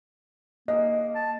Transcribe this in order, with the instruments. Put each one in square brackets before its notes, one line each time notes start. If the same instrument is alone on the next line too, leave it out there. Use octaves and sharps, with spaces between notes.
[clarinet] A#3 [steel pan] D#5
[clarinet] A5